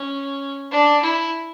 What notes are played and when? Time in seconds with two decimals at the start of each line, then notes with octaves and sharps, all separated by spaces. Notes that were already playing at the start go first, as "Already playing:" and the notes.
Already playing: C#4
0.71 D4
1.02 E4